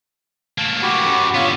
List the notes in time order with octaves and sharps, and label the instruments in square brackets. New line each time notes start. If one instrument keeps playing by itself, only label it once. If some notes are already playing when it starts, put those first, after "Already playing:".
[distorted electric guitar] A3 A#3
[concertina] F#4 G4 B5
[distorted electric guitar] F#2
[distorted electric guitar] D3 B3 [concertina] F4 C#5